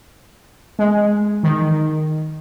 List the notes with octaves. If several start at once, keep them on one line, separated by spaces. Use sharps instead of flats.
G#3
D#3